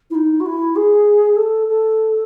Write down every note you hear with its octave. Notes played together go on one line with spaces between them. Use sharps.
E4
D#4
F#4
E4
G#4
A4
A4